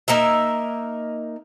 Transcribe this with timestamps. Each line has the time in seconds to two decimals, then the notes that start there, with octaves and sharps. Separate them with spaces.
0.08 A#3 D#4 A#4 E5